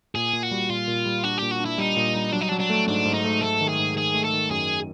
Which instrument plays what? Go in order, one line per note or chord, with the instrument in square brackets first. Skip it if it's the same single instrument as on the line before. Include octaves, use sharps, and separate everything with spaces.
[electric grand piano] A#2 [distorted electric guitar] G#4
[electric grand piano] A#2
[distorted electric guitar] F#4
[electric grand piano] G3
[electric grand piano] A#2 [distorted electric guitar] F4
[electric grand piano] A#2
G3
[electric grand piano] D4 [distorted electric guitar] F#4
[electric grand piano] A#2 [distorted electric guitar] G4
[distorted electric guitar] F#4
[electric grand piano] D4
[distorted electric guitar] E4
[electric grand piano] G3 [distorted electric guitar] D#4
[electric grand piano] A#2
G3
[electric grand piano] F#3 [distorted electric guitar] D4
[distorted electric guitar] D#4
D4
[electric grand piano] F#3
[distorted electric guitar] D4
[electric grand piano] A3
[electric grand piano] G#2 [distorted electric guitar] D4
[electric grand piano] G#2
[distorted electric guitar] D#4
[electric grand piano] A3
[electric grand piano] A3 [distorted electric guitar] A4
[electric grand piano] D#3
[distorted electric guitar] G#4
[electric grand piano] G#2
[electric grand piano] D#3 [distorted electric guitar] G#4
[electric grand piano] A3
[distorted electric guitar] A4
[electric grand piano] D#3
[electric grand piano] F#2 [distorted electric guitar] G#4